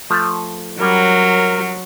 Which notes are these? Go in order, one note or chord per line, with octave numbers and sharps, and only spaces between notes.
F3 A3
F#3 G3 C#4 A#4